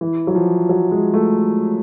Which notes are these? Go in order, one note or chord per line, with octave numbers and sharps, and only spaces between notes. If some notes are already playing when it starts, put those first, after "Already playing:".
E3
F#3
F3
F#3
G#3
A3